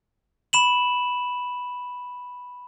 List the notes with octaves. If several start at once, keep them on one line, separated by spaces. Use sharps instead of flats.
B5 E7 F#7